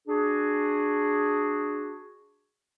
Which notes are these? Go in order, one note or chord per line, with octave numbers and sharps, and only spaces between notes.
D4 F#4 G#4